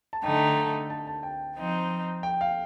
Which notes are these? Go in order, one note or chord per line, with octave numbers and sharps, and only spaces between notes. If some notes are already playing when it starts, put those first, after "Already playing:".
A5
D3 A3 D#4 G5
A5
A5
A5
G5
F3 C4 D#4
G5
F5